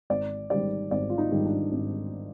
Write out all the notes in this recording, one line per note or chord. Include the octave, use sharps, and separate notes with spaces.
G#1 D5
G#2 D#3 G3 D5
G#1 D5
F4
D#4
G#2 D#3 G3
D4
G#1